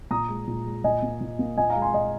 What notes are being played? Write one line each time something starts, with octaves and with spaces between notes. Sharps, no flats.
A#2 A#5 D#6
G#3
A#2
G#3
A#2 D#5 G#5
A#3
A#2
A#3
A#2 D#5 G#5
F5 A#5
G#3
G#5 C6
A#2 D#5